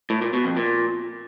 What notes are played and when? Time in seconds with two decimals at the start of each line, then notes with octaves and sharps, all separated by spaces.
0.10 A2
0.22 A#2
0.33 B2
0.45 F2
0.57 A#2